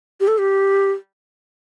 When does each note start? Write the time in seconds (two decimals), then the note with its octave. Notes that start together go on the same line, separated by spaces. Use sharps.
0.20 G4
0.28 A4
0.38 G4